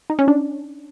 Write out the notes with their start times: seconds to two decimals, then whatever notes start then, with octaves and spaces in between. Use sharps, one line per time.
0.10 D#4
0.19 C#4
0.28 D4